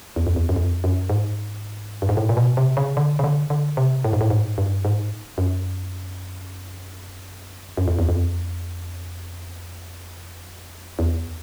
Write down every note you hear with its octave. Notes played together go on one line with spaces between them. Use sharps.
E2
F2
E2
F#2
F2
F#2
G#2
G2
G#2
A2
A#2
B2
C3
C#3
D3
C#3
D3
D3
C3
A2
G#2
A2
G#2
G2
G#2
F#2
F#2
F2
E2
F2
E2